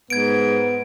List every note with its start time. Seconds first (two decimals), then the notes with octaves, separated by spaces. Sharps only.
0.10 G#2 B3 G#6 D7